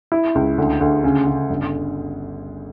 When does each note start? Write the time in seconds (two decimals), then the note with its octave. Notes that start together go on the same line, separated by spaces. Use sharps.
0.12 E4
0.35 C#2
0.58 D2
0.81 D2
1.04 C#3
1.27 C#3
1.50 G1